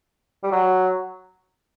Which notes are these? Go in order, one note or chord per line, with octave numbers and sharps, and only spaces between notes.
G3
F#3